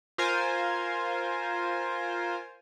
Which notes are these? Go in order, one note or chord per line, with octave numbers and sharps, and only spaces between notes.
F4 A#4 C5 G#5